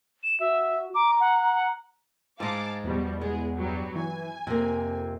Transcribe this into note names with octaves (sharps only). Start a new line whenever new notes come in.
E7
F#4 E5
A#5 D6
F#5
G#2 G#3 F5 A5 D6
E2 B2 F3 G3
G#3 B3 G#4
G2 F#3 G3
E3 G#5
F2 C3 A#3